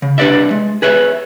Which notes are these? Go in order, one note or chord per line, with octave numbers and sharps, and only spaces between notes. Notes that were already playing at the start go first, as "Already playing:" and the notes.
C#3
C2 D4 G4 B4 D5 E5
G#3
G#4 B4 C#5 E5